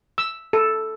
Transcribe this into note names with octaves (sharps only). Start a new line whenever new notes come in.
E6
A4